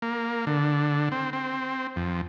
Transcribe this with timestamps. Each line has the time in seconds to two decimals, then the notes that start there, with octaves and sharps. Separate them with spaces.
0.02 A#3
0.47 D3
1.12 C4
1.33 C4
1.96 F2